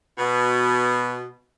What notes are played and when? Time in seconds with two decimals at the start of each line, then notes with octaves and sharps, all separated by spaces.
0.18 B2